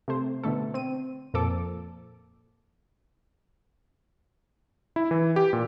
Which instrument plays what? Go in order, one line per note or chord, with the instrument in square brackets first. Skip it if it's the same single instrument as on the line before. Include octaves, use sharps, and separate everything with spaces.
[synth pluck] C3 A3 C5
B2 D3 A3 A4
C4 D#7
F2 A#2 F3 A4 D6
[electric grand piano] E4
E3
G4
A#2